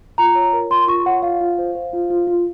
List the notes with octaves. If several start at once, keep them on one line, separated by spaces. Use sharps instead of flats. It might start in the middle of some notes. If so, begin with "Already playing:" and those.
F4 A#5
C#5
A#4
F4 C6
F4 C#6
C#5 F#5
F4 F5
F4
C5
C5
F4
F4
F4